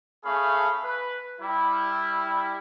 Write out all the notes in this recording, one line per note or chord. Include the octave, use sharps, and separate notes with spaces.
A3 C#4 G#4 F5 B5
B4
G3 E4